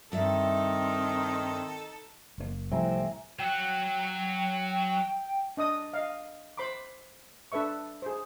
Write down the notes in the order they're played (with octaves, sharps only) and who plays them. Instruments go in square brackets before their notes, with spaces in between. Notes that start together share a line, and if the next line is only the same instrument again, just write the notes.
[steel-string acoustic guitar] G2 D5 E5 [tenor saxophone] D#3 [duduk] C4 [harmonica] D#4 A4
[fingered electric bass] F#1 C#3 A#3
[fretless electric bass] C2 A2 C3 [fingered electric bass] F3 [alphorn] C4 [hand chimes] E5 G#5 A#5
[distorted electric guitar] F#3 F#5 [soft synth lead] G5
[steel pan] D4 D#5 D#6
D#5 F5
C5 B5 C6 D6
D4 A4 B4 E5 C#6
G#4 C5